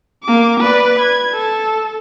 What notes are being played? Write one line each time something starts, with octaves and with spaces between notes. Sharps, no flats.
A#3 D6
B4 D5
G#6
A4